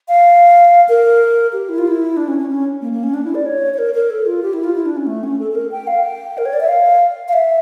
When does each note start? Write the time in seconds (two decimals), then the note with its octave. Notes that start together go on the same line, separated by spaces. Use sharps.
0.08 F5
0.89 A#4
1.53 G4
1.69 E4
1.78 F4
1.87 E4
2.17 D4
2.28 C#4
2.38 C#4
2.50 C#4
2.82 A#3
2.92 A#3
3.03 C#4
3.14 D4
3.25 E4
3.35 D5
3.46 C#5
3.74 C#5
3.78 A#4
3.94 A#4
4.10 A4
4.26 F4
4.43 G4
4.53 E4
4.64 F4
4.75 E4
4.86 D4
4.97 C#4
5.07 A3
5.24 C#4
5.40 A4
5.52 A4
5.55 A#4
5.71 G5
5.87 F5
6.03 G5
6.38 A#4
6.46 C#5
6.53 D5
6.60 E5
6.68 F5
7.28 F5
7.33 E5